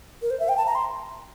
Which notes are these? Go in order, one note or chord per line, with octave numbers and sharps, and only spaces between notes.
A#4
C5
E5
G5
A5
A#5
C6